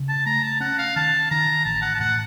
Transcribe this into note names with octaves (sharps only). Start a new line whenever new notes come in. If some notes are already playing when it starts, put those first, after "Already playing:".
Already playing: C#3
A5
A3 A#5
A5
C#4 F#5
F5
D#3 A5
D#3 A#5
A1 A5
F#5
A5
A2 F#5